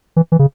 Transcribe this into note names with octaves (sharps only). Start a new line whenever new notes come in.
E3
E3
C#3